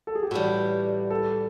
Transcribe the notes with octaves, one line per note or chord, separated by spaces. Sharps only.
A4
G#4
G4
A2 E3 G3 F#4
A4